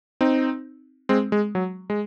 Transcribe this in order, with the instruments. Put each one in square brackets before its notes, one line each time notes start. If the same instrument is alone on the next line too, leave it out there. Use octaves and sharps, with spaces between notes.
[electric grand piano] C4 D#4
G#3 C4
G#3
F#3
G#3